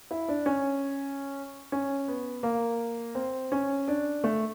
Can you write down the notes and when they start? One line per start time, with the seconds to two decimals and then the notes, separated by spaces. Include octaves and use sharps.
0.11 E4
0.28 D4
0.46 C#4
1.72 C#4
2.08 B3
2.43 A#3
3.15 C4
3.52 C#4
3.88 D4
4.24 A3